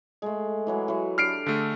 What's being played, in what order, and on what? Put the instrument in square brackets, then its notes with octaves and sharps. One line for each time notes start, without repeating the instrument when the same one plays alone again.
[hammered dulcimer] G#3 A3
E3 F#3 G#3
E3 F#3
[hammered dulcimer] D4 G4 A4 [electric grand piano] F6 C7 D7
[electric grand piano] D3 A3 [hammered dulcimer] G#4 G#5